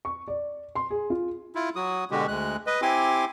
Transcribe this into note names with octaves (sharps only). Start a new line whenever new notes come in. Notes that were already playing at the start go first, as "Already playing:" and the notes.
C#6
D5
C6
G#4
F4
E4 F4
F#3 F#4 D#6
B2 D3 G#3 F#4 G4
D2 G#3 F#6
B4 D#5
C4 E4 G4 G#5 C6 D6